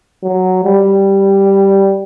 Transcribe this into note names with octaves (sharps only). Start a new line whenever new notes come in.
F#3
G3